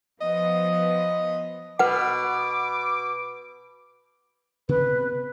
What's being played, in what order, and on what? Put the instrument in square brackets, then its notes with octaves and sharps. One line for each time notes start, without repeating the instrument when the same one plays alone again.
[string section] F3 B3 [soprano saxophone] D#5
[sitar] B2 [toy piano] B4 F#5 [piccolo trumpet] D6
[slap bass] C3 B3 C4 [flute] B4